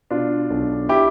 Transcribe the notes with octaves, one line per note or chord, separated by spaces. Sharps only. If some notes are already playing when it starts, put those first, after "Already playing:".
B2 D4 F4
B1
E4 G4